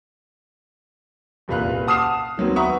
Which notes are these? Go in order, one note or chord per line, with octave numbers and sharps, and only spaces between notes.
F#1 C2 A#2 B4 F5 F#6
F#5 A5 D#6 F6 C7 E7
D#3 F#3 B3 C4
B4 E5 F#5 A#5 C#6 D#6